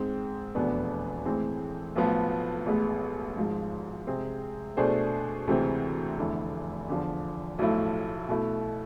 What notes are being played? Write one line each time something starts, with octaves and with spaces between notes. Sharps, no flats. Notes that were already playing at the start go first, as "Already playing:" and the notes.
Already playing: G#2 G#3 C4
F1 E2 B2 B3 D4
A2 E3 G#3 C4
B1 A2 F3 B3
A1 A2 G#3 B3
G#1 G#2 F3 G#3
C3 G#3 C4 G#4
B2 A3 D4 G#4 C5
D2 C3 E3 G#3 C4
F1 E2 D3 A3 E4
E2 D3 F3
B1 A2 F3 A3 E4
B2 A3 E4